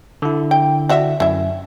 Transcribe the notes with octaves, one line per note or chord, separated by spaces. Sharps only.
D3 E4
G5
D4 F#4 E5
F#2 E4 E5